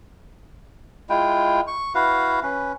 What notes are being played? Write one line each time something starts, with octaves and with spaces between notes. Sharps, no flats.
G#3 E4 F4 G5
C#6
E4 F#4 B4 F5
C#4 B4